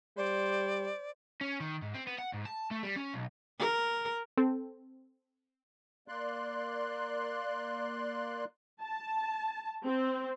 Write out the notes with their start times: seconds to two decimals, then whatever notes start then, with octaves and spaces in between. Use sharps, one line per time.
0.17 G3 C5 D5
1.41 C#4
1.60 D#3
1.82 G#2
1.94 C4
2.07 B3
2.18 F#5
2.33 G#2
2.45 A5
2.71 A3
2.83 G3
2.96 C#4
3.14 B1
3.59 A#4
4.37 C4 A4
6.08 A#3 D5 C6 F#6
8.82 A5
9.85 C4